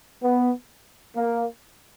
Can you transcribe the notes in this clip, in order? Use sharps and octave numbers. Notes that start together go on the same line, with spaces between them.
B3
A#3